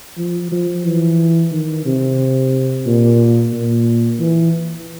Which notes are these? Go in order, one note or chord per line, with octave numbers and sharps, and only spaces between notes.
F3
F3
E3
D#3
C3
A#2
A#2
E3